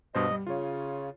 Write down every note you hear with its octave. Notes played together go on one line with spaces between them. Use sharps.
G2 B2 C5 D#5
G3
C#3 F4 C#5